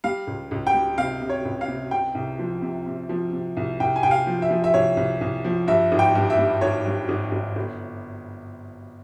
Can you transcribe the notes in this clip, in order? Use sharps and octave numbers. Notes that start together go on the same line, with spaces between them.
G3 F5
C#2
C#2
G5
G3
C3 F5
C3
C#5
C#2
F5
C3
C3 G5
C2
F3
C3
C3
F3
C3
C2
C2 G5
G#5
C2 G5
F5
F3
E5
F3
E5
C2 C#5
C2
C2
F3
G2 E5
G#1
G5
G2
E5
G3
G#1 C#5
G2
G#1
G#1
G1